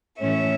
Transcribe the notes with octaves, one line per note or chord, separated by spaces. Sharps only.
A2 E3 A3 C#4 C#5 E5